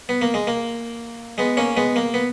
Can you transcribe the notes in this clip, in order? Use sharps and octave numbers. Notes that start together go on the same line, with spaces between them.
B3
A#3
G#3
A#3
G#3 B3
A#3 C#4
G#3 B3
A#3
B3